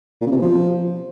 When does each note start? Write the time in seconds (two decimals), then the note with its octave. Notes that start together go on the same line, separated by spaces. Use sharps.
0.21 A#2
0.26 C#3
0.31 C3
0.36 B2
0.42 F3